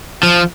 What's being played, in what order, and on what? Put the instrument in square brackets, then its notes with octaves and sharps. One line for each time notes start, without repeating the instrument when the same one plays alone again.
[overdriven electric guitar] F3